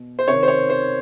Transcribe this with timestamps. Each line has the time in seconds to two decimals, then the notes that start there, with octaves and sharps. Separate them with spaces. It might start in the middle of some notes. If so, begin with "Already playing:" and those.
Already playing: B2
0.19 C5
0.28 C3 D#3 C#5
0.43 C5
0.48 C#5
0.70 C5